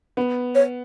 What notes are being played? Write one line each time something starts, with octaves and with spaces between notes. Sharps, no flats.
B3
C#5